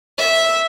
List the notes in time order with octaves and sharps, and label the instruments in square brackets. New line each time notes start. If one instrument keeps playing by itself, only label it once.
[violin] E5